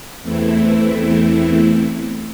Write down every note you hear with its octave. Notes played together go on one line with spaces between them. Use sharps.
E2 E3 A3 C4 E4